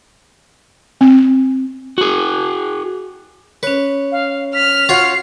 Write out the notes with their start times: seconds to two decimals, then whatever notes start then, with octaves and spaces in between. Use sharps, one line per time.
1.01 C4
1.98 F#4 G#4
3.63 C#4 B4 C#5
4.12 F5
4.55 F6 B6
4.89 F4 F#4 C#5 C7